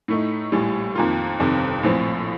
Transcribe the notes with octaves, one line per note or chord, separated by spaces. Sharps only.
A2 A3 D#4
A#1 A2 G3
F2 D#3 A#3 F4
G1 F2 C3 D#3
A#1 A2 F3 C4